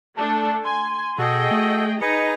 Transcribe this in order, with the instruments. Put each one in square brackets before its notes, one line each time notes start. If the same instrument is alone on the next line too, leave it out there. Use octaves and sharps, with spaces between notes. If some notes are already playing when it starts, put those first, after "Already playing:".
[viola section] A3 D4 A4 [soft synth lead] A5
[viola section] G#5 [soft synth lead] C6
[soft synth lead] B2 [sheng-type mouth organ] F#4 A4 [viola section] G#4 D#5 G5
[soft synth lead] A3
[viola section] D#4 A#5 [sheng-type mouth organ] G#4 B4 D#5 [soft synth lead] C#7